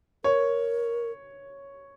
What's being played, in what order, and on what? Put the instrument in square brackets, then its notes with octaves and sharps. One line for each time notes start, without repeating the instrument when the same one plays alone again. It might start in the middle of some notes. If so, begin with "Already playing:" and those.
[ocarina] A#4 [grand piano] C#5